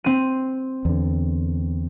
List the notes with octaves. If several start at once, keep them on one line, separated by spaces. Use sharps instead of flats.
C4 D#7
E2 D3